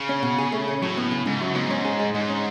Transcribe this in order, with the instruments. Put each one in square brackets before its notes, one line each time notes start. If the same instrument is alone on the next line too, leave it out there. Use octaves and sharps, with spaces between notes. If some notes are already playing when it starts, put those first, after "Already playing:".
Already playing: [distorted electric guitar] C#3
[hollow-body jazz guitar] C#4
B2
G#4
A3
C#4
[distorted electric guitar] A2 [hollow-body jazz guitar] F#3
[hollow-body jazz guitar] B3
C#3
[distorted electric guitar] G#2 [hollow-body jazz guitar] C#3
[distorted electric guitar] F#2 [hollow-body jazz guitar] F#3
[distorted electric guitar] G#2 [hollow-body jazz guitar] B3
[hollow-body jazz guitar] C#4
G#4
G#3
[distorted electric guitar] G#2 [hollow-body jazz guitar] G#3
[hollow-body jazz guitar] C#4